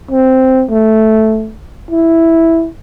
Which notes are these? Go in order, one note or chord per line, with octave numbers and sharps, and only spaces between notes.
C4
A3
E4